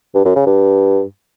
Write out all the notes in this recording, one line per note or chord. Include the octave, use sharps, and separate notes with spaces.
G2
F#2
C#3
G2